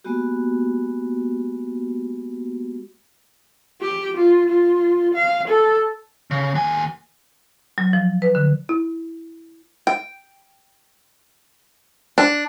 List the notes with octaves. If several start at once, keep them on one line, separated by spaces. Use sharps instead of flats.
G#3 A#3 B3 F#4 G4
G4
F4
F4
F5
A4
C#3
D#2 G#5
F#3
F3
B4
D3
E4
G5
D4